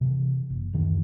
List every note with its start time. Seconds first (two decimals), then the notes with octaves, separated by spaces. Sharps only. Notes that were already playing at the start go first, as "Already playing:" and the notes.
0.01 C3 E3
0.50 F#1
0.73 D1 F#2 D#3 E3